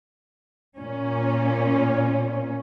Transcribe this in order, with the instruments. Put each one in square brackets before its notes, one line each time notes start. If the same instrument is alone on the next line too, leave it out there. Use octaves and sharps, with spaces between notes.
[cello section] A#2 C#4